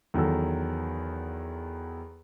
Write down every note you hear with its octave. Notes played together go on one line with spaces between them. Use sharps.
E2 D#3 F#3 A4 E6